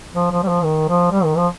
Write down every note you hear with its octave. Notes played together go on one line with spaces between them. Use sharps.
F3
F3
G3
F3
D#3
F3
G3
D#3
F3